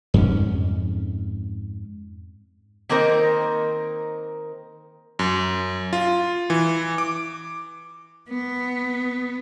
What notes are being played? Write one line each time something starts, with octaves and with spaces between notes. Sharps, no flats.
F2 G#2 C#4
D#3 A#3 C4 D#4 A#4 C5
F#2
F4
E3
D6
B3